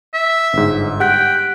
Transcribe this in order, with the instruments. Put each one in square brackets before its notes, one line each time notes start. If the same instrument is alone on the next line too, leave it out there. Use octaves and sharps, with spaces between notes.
[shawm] E5
[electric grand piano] G1 G#2
[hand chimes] G4 F#6 B6 [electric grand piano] F#5 [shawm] G5